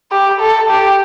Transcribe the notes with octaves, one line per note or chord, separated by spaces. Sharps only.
G4
A4
G4